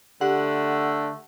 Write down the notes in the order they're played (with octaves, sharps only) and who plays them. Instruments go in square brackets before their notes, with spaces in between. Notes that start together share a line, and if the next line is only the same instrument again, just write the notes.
[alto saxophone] D3 [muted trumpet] A3 [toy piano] G4 [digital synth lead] F#5